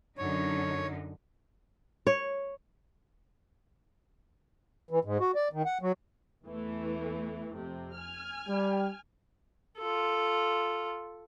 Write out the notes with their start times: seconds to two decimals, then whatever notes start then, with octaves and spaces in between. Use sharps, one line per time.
0.18 F#2 D3 D#4 C#5
2.07 C#5
4.91 E3
5.05 G#2
5.20 F#4
5.35 D5
5.53 D#3
5.65 F#5
5.82 F#3
6.45 E2 E3 A3
7.55 F2 C3
7.94 G#5 F6
8.48 G3
9.78 F4 A4